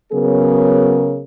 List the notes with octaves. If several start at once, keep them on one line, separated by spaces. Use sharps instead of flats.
C#3 F#3 B3 G#4 A#4